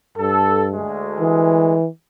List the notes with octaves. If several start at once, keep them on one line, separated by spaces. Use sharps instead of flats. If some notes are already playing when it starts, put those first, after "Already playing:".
G2 A4
D2 G#3
E3